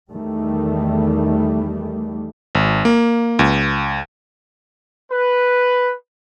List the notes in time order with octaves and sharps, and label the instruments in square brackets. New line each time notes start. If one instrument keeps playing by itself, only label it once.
[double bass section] E2 D#3 G3 A3
[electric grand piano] G#1
A#3
C#2
[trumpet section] B4